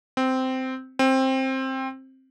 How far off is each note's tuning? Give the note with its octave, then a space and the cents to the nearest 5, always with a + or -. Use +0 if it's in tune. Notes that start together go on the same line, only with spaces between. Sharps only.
C4 -10
C4 +15